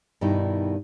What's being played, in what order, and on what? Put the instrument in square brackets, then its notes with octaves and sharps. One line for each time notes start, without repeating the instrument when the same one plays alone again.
[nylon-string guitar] G2 B2 D#3 G3 D#4 E4